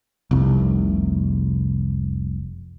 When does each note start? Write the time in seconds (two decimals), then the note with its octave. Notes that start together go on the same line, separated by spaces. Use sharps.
0.31 F1 C2